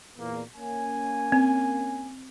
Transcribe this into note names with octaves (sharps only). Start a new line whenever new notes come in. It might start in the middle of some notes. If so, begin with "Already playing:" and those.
E2 A#2 A#3
A#3 C#4 G#5
C4